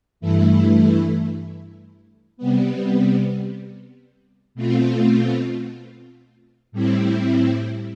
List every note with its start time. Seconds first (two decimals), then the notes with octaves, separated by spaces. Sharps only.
0.21 G2 E3 A3 E4
2.37 C3 G3 B3
4.55 B2 A3 C4 F4
6.72 A2 G3 C4 E4